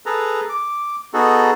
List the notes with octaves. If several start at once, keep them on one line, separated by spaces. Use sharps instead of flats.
G#4 A4 B4 A#5
D6
B3 D#4 F#4 G#4 A4